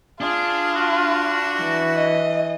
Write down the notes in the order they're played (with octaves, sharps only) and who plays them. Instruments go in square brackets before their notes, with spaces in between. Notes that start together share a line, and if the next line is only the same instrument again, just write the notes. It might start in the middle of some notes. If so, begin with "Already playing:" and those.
[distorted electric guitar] D4 [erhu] F4 [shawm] G#4
[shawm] F#4
[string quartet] E3
[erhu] D#5